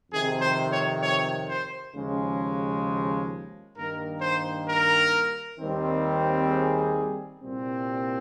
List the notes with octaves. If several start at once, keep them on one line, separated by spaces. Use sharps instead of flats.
F2 C3 D#3 G#4
C5
C#5
C#5
C5
D#2 C#3 F3 G#3
G2 D#3 A#3 A#4
C5
A#4
D#2 D#3 G3 C4
G#4
C2 A#2 G3 C4